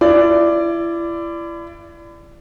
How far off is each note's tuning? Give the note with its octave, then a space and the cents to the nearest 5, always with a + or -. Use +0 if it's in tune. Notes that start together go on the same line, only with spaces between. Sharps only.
E4 +35 D5 +0